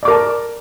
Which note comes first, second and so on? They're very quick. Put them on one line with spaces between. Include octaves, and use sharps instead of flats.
D5 D6 A#4 A5